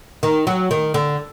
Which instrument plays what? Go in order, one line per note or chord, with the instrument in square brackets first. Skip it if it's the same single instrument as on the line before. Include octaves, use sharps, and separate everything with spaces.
[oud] D#3
F#3
D#3
D3